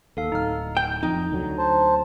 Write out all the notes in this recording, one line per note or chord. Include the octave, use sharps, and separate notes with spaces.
D#2 A4 F5
D1 D#4 F6
G5 G6
F2 D#4
D2 D3 F#3
C5 A5